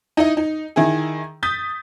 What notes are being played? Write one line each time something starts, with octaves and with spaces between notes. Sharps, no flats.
D#4 E4 D#5
D#4
D#3 E4 G#4
D#6 G6 A6 B6